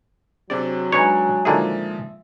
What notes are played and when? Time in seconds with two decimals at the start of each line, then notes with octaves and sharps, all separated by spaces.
0.50 C3 F#3 C4 D4 G#4 D5
0.92 G#3 D4 D#4 B4 C#5 G#5 F#6
1.45 A#2 D3 D#3 F3 G#3 G#4 E5